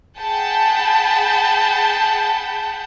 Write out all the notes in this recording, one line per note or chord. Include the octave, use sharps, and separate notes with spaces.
G#4 F#5 G5 A5 B5 G6